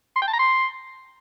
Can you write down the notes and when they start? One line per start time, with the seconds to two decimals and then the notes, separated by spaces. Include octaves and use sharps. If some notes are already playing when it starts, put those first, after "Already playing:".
0.16 C6
0.22 G5
0.28 A5
0.33 A#5
0.39 C6